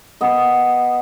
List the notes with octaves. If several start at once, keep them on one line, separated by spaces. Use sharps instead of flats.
B3 D#5